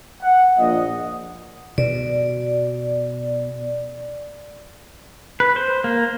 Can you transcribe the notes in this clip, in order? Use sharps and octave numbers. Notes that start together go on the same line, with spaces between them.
F#5
A#1 A#2 D#5
B2 D5
B4
C5
A#3